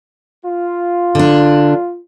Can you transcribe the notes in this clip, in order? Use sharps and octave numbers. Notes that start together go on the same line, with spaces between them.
F4
D3 D4